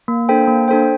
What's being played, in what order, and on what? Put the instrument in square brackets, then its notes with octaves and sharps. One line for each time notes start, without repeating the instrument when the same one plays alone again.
[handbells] A#3
D4 A4 C5 G5
A#3
D4 A4 C5 G5